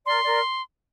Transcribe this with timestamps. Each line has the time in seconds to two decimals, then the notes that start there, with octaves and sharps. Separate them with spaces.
0.06 A#4 D5 C6
0.25 A#4 D5